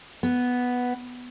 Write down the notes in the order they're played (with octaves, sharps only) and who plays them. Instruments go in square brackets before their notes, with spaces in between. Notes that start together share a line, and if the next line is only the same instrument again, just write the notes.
[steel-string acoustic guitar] B3